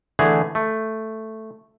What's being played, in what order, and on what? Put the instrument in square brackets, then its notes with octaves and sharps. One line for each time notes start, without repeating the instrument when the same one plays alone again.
[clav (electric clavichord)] D3 E3 A3 G#4
A3